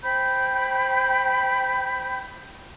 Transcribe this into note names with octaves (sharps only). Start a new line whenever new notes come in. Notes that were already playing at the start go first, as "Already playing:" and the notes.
C5 G5 B5 G6